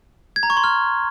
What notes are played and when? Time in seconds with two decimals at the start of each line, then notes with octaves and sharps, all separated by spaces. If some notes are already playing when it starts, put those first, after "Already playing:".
0.36 G#6
0.43 A#5
0.50 C#6
0.57 C6
0.64 F6